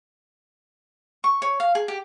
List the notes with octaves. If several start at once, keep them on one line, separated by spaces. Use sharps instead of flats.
C#6
C#5
F5
G#4
G4